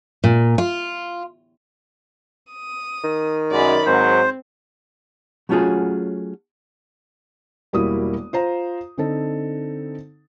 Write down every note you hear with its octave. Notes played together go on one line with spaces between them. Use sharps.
A#2
F4
D#6
D#3
F#2 G#3 D5 B5
G#2 F#3 C4 C5
F#3 A3 C#4 F4 F#4 G#4
E1 G3 A#3 E4 F#4 D#6
F4 C5 A#5
D3 C4 D#4 A4